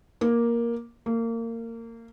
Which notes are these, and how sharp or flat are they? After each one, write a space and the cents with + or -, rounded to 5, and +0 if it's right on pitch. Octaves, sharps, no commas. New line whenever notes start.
A#3 +10
A#3 -25